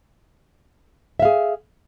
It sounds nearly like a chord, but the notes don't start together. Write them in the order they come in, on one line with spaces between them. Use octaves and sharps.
E5 F5 G#4